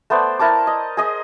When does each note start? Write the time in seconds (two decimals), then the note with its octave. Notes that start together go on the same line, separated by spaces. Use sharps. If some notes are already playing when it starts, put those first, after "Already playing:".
0.10 A3 B3 C5 D5
0.39 E4 A#4 A5 D6
0.67 D#5
0.97 G#4 D#5 D#6